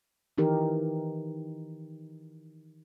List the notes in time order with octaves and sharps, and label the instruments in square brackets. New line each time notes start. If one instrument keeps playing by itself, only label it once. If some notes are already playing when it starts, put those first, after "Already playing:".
[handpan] D#3 E3 D#4 G4 A#4